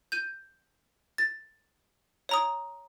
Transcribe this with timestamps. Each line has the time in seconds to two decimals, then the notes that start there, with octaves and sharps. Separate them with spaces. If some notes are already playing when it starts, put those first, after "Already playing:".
0.12 G6 D#7
1.18 A6
2.29 C#5 A#5 D#6